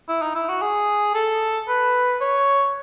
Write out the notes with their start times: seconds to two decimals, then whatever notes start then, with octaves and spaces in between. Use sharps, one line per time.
0.09 E4
0.22 D#4
0.35 E4
0.49 F#4
0.62 G#4
1.15 A4
1.68 B4
2.21 C#5